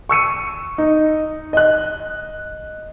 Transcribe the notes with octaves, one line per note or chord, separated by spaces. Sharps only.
C#6 E6 C#7 D#7
D#4
D#5 F#6